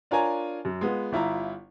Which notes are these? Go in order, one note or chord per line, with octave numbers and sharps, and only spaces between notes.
D4 F4 A#4 C#5 G#5 A#5
F#2
G#3 B3 F4
G1 E4 F4 A#5